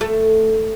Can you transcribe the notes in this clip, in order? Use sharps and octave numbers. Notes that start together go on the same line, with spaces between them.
A3